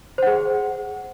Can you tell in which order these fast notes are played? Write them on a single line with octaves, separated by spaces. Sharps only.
C5 F#5 G#4